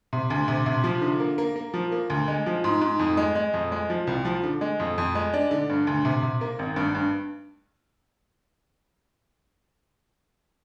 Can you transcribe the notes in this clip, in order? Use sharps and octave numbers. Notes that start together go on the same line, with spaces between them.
C3
D2
C3
C3
F3
D3
A#3
A#3
A#3
F3
A#3
D2
G#3
F3
G#2
G#2
F2
G#3
G#3
F2
G#3
F3
C2
F3
D3
G#3
F2
F2
G#3
D4
D3
G2
D2
C3
C3
A#3
G#1
G2
G2